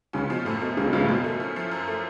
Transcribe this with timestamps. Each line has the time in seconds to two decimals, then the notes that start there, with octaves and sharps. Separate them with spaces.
0.13 C#2 C#3 C#4
0.30 B2 F3
0.45 F#2 A2
0.61 B2 A3
0.77 C#2 C#3 C#4
0.86 B2
0.93 C#2 C#3 F3
1.03 A2
1.09 F#2 B2
1.24 A3
1.40 C#4
1.56 F3
1.71 F#2
1.88 A3